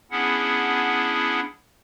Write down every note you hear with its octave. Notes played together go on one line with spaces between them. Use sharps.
B3 C#4 D4 E4 G#4 F#5